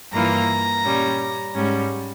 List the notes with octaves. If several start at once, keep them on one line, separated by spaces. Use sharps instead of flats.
G2 E3 A#3 F4 A#5
A#2 G3 C#4
G#2 G3 C#4